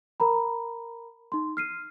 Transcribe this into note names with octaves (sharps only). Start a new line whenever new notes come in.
A#4 A#5 B5
D#4 C6
F6 C7 D#7